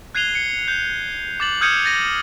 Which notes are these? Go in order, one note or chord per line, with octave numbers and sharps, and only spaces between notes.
F#6 G#6 C7 D#7 F7 G7
C#7
G6
D6 A6 F#7
D#6 F6 G6 G#6 C#7 D#7
G6 A6 A#6 D#7